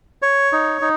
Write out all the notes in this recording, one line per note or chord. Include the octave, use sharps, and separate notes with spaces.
C#5
D#4
D#4